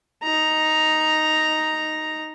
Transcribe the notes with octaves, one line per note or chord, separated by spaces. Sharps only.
D#4 A#5